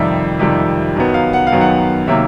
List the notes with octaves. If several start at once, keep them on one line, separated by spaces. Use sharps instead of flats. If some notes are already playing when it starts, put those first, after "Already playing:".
Already playing: F2 C3 D#3 G3 E5
F2 C3 D#3 G3
F#2 D#3 F#3 B3
F5
F#5
F5
F#2 D#3 F#3 B3
F#5
C3 D#3 F#3 A#3 E5